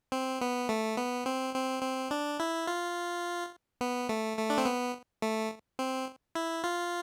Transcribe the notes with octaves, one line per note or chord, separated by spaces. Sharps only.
C4
B3
A3
B3
C4
C4
C4
D4
E4
F4
B3
A3
A3
D4
C4
B3
A3
C4
E4
F4